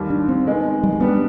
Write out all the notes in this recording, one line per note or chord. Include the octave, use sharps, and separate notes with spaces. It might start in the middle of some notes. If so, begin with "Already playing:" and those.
Already playing: D#2 D#3 G3
D4
C4
D#3 G#3 B3
G3
G#3
G3 B3 D4 G4